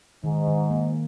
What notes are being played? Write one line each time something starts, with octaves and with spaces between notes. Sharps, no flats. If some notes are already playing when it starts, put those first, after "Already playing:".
G#2 D#3
D#3
A#3